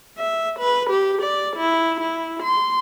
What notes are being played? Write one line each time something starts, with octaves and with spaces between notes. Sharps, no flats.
E5
B4
G4
D5
E4
E4
C6